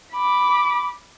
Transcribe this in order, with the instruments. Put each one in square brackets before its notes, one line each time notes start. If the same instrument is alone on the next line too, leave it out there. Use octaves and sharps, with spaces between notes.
[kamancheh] B5 D6